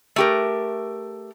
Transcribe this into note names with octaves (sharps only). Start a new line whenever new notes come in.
A3 G4 A#4